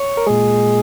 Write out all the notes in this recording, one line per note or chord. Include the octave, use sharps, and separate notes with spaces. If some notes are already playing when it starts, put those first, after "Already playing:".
Already playing: C#5
A#4
A#2 G#3 G#4